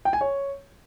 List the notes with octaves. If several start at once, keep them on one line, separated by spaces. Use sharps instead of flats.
G5
G#5
C#5